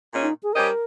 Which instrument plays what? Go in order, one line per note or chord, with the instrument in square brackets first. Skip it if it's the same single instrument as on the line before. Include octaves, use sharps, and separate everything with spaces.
[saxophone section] A#2 G#3 C#4
[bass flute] D#4
G#4
[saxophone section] G3 C#4 G4 C5 D#5 [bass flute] A#4